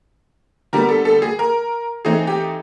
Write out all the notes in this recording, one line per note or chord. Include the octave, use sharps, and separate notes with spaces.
D3 G3 B3 A#4
A4
A4
G#4
A#4
E3 A3 C4 D#4 G#4
G4